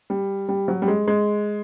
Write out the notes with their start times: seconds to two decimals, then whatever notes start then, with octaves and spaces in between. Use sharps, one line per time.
0.10 G3
0.49 G3
0.68 F#3
0.82 G3
0.88 G#3
1.08 G#3